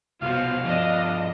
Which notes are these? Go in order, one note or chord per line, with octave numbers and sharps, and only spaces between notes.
C2 B2 F4 F#4 C5 F5
G2 F3 D4 D#5